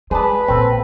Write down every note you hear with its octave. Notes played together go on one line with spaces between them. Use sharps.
G#3 G#4 B4 D5 A5
A#1 A#2 C4 A4